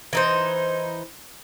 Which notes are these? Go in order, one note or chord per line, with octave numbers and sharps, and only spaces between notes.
E3 D#4 C5